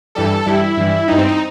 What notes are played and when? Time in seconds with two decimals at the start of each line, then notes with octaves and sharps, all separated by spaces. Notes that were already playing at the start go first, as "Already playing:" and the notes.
0.15 G2 E3 G3 A4
0.46 G2 E3 G3 E4
0.77 G2 E3 G3
1.08 G2 E3 G3 D#4
1.18 C4
1.28 D#4